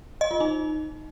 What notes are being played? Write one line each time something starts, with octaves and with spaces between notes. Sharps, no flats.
D#5
F4
D#4